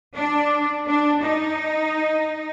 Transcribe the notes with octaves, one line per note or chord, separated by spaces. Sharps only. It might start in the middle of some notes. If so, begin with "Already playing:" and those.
D4
D4
D#4